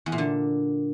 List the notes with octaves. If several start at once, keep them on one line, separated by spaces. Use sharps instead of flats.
E2
A#2
D3